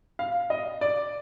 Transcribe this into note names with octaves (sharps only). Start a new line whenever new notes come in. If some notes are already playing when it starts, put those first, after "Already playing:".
F5
D#5
D5